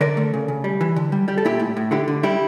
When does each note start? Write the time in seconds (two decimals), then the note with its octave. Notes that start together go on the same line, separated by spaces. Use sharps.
0.01 D3 A#4 D5
0.17 A3
0.34 C#3
0.48 C#3
0.64 G3
0.81 E3
0.96 D3
1.12 G3
1.28 G3 G4
1.38 A4
1.45 A#2 E4 G4
1.60 A2
1.77 A2
1.91 D3 E4 G4
2.08 D3
2.23 G3 E4 G4